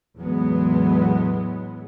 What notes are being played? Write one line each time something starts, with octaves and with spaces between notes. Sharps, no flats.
E2 A2 F#3 G#3 B3